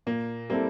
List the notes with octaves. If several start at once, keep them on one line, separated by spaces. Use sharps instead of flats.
A#2 A#3
G3 A#3 C4 E4 A4